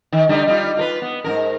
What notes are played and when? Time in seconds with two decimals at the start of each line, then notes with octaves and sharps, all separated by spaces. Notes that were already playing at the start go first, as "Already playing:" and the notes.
0.12 D#3
0.29 D3 G3 D#4
0.47 G3 D#4 F4
0.77 F4 A#4 B4
1.02 B3
1.24 G#2 D3 A#4